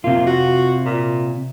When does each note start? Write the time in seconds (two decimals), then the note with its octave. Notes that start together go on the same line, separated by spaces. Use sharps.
0.04 C3 A#3 F4
0.27 F#4
0.85 A#2